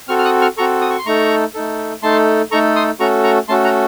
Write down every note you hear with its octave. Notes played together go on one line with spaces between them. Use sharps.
C4 F#4 A4 C#6 F6
F6
D#6 F#6
C#6 F6
C4 F#4 A4 A#5 C#6
D#6
C#6
C6
A3 D#4 A4 A#5 C#6
A3 D#4 A4
A3 D#4 A4 A5 C6
A3 D#4 A4 A#5 C#6
C6 D#6
A3 C#4 F#4 A4 A#5 C#6
A#5 C#6
A3 C#4 F#4 A4 A5 C6
F#5 A#5